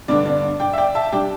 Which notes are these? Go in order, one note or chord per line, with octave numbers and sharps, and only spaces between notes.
G2 D3 B3 D4 D5
D5
D5 G5
E5
D5 G5
E5 A5
G3 D4 D5 G5